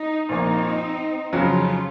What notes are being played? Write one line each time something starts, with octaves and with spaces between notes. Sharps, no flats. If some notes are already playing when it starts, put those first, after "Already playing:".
Already playing: D#4
A#1 A#2 F3 A#3 C4 D#4
F2 C#3 F#3 C#4 F4